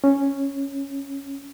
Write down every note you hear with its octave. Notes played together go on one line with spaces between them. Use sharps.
C#4